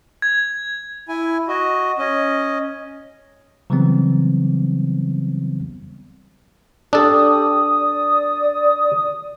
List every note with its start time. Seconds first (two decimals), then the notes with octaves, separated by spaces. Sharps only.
0.22 G#6
1.08 E4 G#5
1.48 F#4 D#5
1.98 C#4 D#5
3.70 C#3 E3 F#3 G3 B3 C4
6.93 D4 G4 A4 D#6
7.80 D5